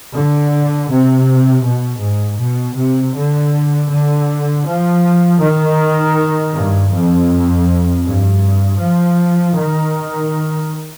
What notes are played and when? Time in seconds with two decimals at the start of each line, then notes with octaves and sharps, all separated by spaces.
0.13 D3
0.89 C3
1.64 B2
2.01 G#2
2.38 B2
2.76 C3
3.15 D3
3.90 D3
4.65 F3
5.41 D#3
6.53 G2
6.91 F2
8.04 G2
8.79 F3
9.54 D#3